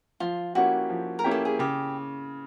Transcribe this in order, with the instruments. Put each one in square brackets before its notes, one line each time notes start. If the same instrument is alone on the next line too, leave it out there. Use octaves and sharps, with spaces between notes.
[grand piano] F3 [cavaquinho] F4
[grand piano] A#3 C#4 E4 G4 [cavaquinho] F#4
[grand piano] F3
[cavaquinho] A#4
[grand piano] A#3 C#4 E4 G4
[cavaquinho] A4
G#4
[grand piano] C#3 [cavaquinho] G4